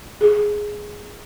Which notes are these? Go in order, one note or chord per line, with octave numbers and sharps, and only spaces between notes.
G#4